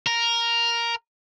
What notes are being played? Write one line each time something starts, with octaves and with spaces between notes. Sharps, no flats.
A#4